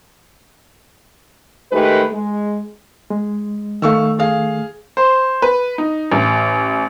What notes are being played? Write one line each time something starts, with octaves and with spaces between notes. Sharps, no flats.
D#3 G#3 A3 G4 B4
G#3
G#3
D#3 A3 F5 C#6 E6
G#4 F5
C5
B4
D#4
A1